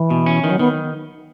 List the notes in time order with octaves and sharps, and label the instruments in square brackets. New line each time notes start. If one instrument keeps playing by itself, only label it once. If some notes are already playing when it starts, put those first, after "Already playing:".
Already playing: [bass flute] E3
[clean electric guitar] B2
C#4
[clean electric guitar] D#3 [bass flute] E3
[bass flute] F#3
[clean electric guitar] D#3 [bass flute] B3